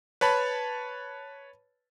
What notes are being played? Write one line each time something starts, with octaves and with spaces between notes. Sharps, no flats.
B4 C#5 A5 B5